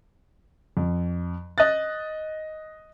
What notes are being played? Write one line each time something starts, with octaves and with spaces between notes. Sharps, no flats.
F2
D#5 F#6 A6